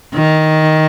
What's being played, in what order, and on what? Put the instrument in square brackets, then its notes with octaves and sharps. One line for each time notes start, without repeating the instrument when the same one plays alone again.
[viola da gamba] D#3